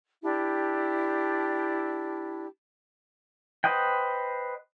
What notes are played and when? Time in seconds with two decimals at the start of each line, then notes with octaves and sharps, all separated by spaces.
0.22 D4 E4 G4
3.64 B4 C5 D#5 F#5 G5